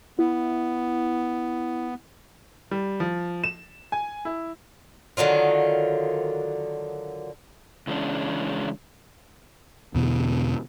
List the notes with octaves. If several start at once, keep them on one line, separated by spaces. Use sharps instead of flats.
B3 E4
G3
F3
E7
G#5
E4
D3 D#3 F#3 F4
C#3 E3 G#3 C#4 D4
E2 B2 D3